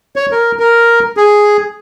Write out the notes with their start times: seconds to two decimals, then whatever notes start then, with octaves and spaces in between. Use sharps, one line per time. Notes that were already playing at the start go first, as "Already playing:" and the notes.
0.16 C#5
0.31 A#4
0.59 A#4
1.17 G#4